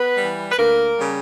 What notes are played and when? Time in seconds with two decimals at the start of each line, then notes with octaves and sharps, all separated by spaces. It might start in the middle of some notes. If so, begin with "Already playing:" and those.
Already playing: B3 B4
0.17 E3 G3
0.52 B4
0.58 D2 A#3 A#4
0.98 C#3 G3